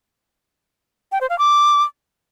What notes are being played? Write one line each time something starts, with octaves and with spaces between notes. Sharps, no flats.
G5
C5
F5
D6